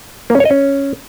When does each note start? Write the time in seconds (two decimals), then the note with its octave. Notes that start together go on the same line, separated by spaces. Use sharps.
0.30 A#3
0.35 C#4
0.40 C#5
0.45 D#5
0.51 C#4